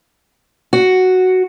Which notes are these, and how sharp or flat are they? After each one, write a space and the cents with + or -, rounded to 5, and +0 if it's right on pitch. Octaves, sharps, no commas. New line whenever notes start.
F#4 +0